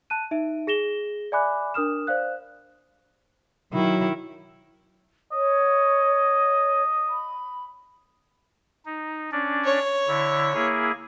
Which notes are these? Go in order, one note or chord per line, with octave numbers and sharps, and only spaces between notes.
A5 F#6 D#7
D#4 E5 D7
G#4 A#6 E7 G7
D5 E5 G#5 B5 D6 F#6
D4 A#4 D#6 F6 E7
C5 D5 F5 F#6
D#3 F#3 E4
C#5 D#5
B5
D#4
C#4 D4 D5
C#5
D3 E4
A#3 E4 G#4